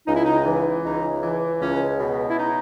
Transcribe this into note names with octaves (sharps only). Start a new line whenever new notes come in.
C#2 D#4
E4
D#4
E3
C#2 D#4
E3
C#2 C#4
B2
E4
D#4